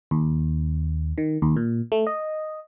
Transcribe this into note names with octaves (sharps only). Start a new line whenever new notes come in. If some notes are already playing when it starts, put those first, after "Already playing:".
D#2
D#3
D#2
A#2
A3
D#5